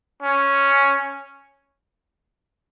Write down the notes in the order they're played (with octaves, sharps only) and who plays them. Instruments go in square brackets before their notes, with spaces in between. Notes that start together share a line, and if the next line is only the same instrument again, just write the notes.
[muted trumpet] C#4